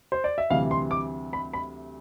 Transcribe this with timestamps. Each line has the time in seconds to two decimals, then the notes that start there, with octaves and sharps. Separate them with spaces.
0.12 C5
0.24 D5
0.38 E5
0.50 D2 C3 E3 G3 F5
0.71 C6
0.91 D6
1.33 B5
1.53 B5